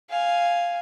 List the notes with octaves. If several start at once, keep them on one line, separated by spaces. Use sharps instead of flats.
F5 G#5